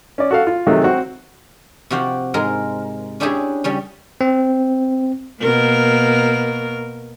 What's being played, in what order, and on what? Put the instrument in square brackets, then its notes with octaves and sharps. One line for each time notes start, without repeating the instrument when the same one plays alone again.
[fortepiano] C#4 D5
F#4 A4 F5
F4
C3 D#3 F#3 G#3 A3
C4 F#4
[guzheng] C3 F3 F#4 F5 G5
G#2 G#3 A#4
C#4 D4 E4 G4 G#4 G#5
C#3 G3 C#4
[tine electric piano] C4
[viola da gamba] B2 A#3 A#4